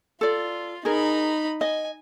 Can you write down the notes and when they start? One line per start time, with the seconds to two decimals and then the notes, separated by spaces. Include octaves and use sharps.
0.21 F4 A4 D5
0.85 D#4 G#4 A#4 B5
1.61 D#5 G#5